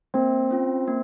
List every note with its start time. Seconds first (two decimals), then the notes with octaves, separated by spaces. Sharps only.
0.14 A#3 C4
0.51 C#4 F4
0.87 A#3